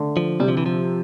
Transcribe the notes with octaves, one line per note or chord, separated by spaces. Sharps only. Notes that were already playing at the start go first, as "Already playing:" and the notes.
Already playing: D3 A3
F3
C3 G3
F3
E3
F3